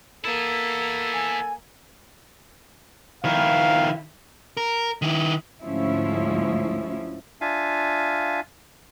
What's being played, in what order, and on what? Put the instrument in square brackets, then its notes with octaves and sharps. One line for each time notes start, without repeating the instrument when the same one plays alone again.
[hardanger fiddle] A#3 [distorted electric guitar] B3 E4 [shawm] A4
[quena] G#5
[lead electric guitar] D#3 E4 [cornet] F5
[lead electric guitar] A#4
D#3 E4
[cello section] D2 G#2 F3 C#4 E4
[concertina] D4 F4 E5 F5 G#5